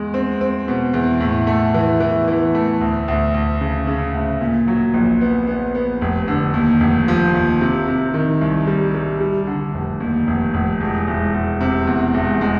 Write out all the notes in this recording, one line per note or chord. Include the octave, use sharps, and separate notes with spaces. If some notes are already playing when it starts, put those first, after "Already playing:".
Already playing: E2 G#3
C4
C4
B2
E2
A2
A3
E3
E3
E3
A3
D2
D2
D2
C#3
C#3
D2
A#2
F#3
A#1
B3
B3
B3
F1
D3
D#2
F1
F3
D#2
C3
C3
D#3
C2
G3
G3
G3
D3
F1
D#2
F1
F1
E1
E1
E1
C3
E2
E1
G#3